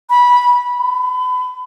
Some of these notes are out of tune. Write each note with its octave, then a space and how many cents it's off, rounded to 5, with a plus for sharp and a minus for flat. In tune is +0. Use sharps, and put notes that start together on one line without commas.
B5 -15
B5 +30